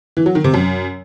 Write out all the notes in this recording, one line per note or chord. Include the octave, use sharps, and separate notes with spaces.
E3
F#3
D#3
C3
F#2